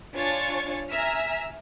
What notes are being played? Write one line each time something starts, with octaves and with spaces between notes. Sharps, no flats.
D4 F4 C#5 G#5 C#6 A6
E5 G#5 A#5 E6 F6 B6